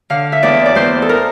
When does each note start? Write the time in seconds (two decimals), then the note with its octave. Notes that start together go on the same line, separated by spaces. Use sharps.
0.10 D3 F5
0.32 E5
0.43 E2 D5
0.66 D5
0.75 E2 C5
1.02 A4
1.09 A#4